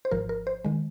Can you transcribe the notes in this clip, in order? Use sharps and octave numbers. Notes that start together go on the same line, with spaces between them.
C5
G#1 G#2 F3 A#4
A#4
C5
D#3 G#3